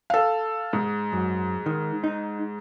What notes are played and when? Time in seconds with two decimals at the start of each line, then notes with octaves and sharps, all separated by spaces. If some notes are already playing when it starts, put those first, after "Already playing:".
0.10 A4 F5
0.73 G#2
1.13 F#2
1.66 D#3
2.04 D#4